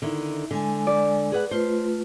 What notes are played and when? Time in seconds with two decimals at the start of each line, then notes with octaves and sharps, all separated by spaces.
0.02 D3 D#3 E4
0.51 D3 G#3 G#5
0.87 D5
1.32 G#4 B4 F#5
1.51 A3 F4 B4 C5